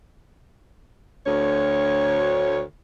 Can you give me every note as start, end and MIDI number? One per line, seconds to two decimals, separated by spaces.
1.27 2.61 38
1.27 2.61 73